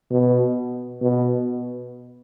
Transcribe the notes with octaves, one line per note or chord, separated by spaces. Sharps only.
B2
B2